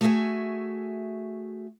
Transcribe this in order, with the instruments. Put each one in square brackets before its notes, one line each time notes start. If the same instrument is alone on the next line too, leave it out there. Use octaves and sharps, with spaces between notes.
[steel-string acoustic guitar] A3 F#4 G#4 C5 E5 G#5